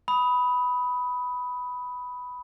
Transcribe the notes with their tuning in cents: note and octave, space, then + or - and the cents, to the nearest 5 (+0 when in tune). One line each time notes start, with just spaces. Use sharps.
B5 +0 D#6 +20